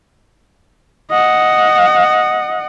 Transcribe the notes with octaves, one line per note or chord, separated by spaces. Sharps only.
D#5 F#5